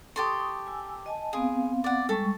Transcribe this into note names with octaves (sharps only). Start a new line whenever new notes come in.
G4 A4 C6 C#6 D#6
G#5 E6
D#5 G#5 A5
B3 C4 G#4 F5
D5 F#5
G3 G#3 A4 C#6